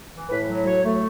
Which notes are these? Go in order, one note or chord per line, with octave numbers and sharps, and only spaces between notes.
E3
A2 B4
F#3
F#3 C#5
A3